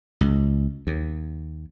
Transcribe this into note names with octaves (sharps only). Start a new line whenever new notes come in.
C#2
D#2